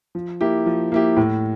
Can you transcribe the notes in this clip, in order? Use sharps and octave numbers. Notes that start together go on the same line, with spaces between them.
F3
A#3 E4 G4
F3
A#3 E4 G4
A2